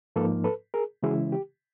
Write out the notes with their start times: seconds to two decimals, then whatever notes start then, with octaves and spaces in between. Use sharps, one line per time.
0.16 G#2 F3 A#3 D#4 A4 B4
0.44 A4 B4
0.74 G#4 A#4
1.03 C#3 E3 G#3 C#4 E4 F#4 G#4
1.32 G4